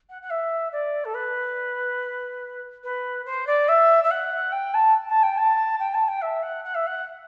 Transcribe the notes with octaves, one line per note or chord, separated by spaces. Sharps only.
F#5
F#5
E5
D5
A4
B4
B4
C5
D5
E5
E5
F#5
G5
A5
A5
G5
A5
G5
A5
G5
E5
F#5
F#5
E5
F#5